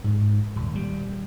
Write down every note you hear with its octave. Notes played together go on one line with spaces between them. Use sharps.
G#2
D#1
G3